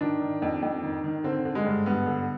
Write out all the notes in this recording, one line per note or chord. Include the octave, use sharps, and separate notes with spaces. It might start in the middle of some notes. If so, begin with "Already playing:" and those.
D#3 D4
D#3
F2
F2
D#3
D#3
D3 C4
D3
G#3
G2
G2 B3
D3